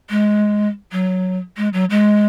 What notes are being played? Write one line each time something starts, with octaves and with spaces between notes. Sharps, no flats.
G#3
F#3
G#3
F#3
G#3